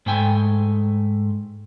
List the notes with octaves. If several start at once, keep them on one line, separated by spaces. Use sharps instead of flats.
G#2 A3 G5 G#5